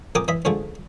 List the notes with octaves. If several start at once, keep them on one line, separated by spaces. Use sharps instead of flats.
F2 A#4 G5 G#5 D6 D#6
E3 D#5 E5 B5
G#2 D3 F3 G#3 A3